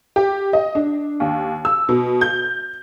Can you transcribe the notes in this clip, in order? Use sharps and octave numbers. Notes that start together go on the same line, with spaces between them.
G4
D#5
D4
D#2
E6
B2
G6